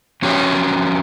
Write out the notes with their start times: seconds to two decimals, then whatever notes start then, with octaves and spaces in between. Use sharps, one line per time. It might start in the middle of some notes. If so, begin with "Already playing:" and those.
0.22 F2 C#4 F#4 G4 C#5